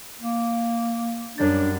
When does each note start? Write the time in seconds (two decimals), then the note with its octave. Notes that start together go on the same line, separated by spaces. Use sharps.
0.21 A#3
1.38 F#2 G3 D4 A6